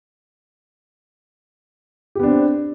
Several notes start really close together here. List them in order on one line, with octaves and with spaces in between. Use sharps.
G4 B3 D4 C4